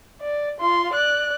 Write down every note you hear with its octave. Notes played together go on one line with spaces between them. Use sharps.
D5
F4 C6
D5 F#6